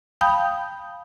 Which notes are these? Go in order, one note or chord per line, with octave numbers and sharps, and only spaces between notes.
F5 G5 A5 B5 D#6 G6